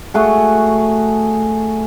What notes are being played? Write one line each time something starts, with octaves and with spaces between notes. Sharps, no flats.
A3 F#4 G#4